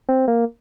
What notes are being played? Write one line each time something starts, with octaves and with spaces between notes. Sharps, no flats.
C4
A#3